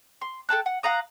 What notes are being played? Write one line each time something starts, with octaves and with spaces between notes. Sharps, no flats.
C6
A4 G5 A5 F#6
F#5
F5 F#5 A#5 D#6